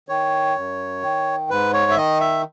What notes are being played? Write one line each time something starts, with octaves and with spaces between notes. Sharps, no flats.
D#3 C#5
F#2
D#3
G#2 B4
C#5
E5
D#3 D#5
E5